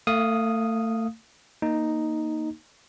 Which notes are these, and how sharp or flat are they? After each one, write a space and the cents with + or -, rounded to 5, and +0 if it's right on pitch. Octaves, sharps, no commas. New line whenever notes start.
A3 +30 F5 +0 D#6 +0
A#3 +0 D#4 +0